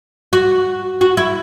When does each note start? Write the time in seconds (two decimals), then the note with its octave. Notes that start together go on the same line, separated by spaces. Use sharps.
0.33 F#4
1.01 F#4
1.17 E4